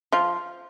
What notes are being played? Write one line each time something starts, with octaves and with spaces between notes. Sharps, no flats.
F3 F4